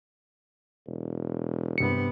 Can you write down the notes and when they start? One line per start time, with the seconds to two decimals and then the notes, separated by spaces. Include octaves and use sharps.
0.87 E1
1.78 G2 C3 B3 C#7